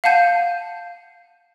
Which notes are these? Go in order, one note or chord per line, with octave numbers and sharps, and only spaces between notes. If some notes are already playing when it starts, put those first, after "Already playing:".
F5 F#5 A5 G6 D#7